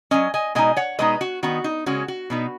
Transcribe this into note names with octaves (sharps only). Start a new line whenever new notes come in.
F#3 C#4 D#5 G#5
D#5 G#5
B2 G#3 D#4 D#5 G#5
C#5 F#5
B2 G#3 B3 D#4 B4 D#5
F#4
D#3 B3 D#4 F#4
D#4
C#3 G#3 C#4 F#4
F#4
B2 B3 D#4